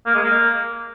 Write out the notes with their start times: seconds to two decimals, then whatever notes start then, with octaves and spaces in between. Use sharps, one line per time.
0.06 A#3
0.15 G#3
0.23 A#3